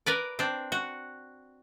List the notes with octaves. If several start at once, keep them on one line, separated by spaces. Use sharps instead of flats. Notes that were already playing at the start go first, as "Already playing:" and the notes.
A#4 B4 D5
C4 D4
F#4